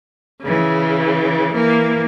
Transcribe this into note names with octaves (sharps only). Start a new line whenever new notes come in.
C#3 E3
E3 A#3